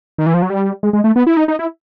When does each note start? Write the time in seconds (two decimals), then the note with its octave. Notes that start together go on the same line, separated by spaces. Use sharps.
0.18 D#3
0.26 E3
0.34 F3
0.42 F#3
0.50 G3
0.83 G#3
0.93 G#3
1.04 A3
1.16 B3
1.27 E4
1.37 D#4
1.48 D#4
1.59 E4